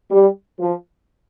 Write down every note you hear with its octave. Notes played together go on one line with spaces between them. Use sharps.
G3
F3